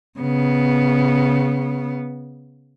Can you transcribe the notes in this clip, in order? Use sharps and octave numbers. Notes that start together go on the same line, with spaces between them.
C#3 B3